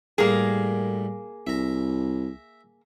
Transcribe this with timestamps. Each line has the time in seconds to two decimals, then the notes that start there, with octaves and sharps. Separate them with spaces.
0.18 A2 G3 A#3 G#4 A#4
1.47 C2 E5 A#5